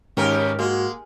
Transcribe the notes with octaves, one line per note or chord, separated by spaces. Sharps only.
D#2 G#2 C#4 G4 A#4 F6
G#3 A#3 F#4